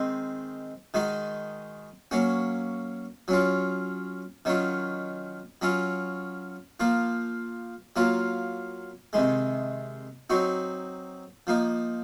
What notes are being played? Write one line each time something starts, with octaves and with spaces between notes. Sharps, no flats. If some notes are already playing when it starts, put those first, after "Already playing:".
Already playing: D#3 G#3 C4
D#3 G#3 D#4 F#4
F#3 A#3 C#4 F#4
F#3 C#4 F4
D#3 F#3 C#4 F4
F#3 C#4 F4
F3 A#3 F4
F#3 A#3 F4
C3 D#3 G#3
F#3 C4 D#4 F#4
F3 A#3 D#4